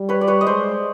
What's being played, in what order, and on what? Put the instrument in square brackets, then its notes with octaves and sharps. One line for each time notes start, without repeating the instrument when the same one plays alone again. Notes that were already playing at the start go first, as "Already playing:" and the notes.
Already playing: [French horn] G3
[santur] B4 C#5
D5
B4 C#5
D#5
[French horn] G#3 [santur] C5 D5